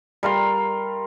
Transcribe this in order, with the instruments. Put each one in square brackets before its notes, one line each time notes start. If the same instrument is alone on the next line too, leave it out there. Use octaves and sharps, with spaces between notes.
[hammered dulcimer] G3 A#4 F5 C6